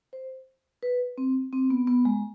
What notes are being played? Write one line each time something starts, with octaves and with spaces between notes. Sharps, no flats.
C5
B4
C4
C4
B3
B3
G#3